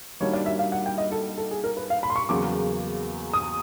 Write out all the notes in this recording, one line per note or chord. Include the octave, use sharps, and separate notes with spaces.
D#3 G3 A#3 D4 F#4 C#5
D5
E5
F5
F#5
G5
D#5
A4
A4
G#4
A#4
B4
F5
B5
C6
C#6
E2 C#3 F#3 A#3 D6
D#6